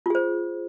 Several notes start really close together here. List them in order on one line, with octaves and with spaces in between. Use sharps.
F4 G#4 C5